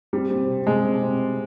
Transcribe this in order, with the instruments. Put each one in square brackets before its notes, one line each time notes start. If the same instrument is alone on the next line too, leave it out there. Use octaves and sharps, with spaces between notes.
[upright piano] G3 [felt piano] C4
[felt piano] C4
C3
[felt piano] C3 [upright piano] G#3
[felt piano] C4
C3